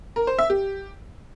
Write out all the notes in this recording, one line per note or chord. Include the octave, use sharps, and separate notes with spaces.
A#4
C5
E5
G4